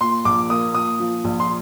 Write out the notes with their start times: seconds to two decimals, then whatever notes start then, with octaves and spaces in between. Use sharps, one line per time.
0.01 A#2 C6
0.25 A#1 D6
0.50 A#3 D#6
0.75 A#2 D#6
1.00 F3
1.24 A#1
1.40 C6